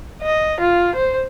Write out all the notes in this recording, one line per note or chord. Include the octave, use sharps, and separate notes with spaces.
D#5
F4
C5